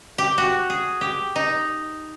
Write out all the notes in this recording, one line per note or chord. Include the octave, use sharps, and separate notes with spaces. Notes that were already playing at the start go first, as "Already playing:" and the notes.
G4
F#4
G#4
G4
D#4